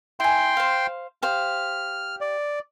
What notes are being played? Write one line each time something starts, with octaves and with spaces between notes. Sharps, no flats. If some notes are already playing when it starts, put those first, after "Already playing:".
E4 G5 G#5 C6
C5 F5
G4 C5 F5 F6
D5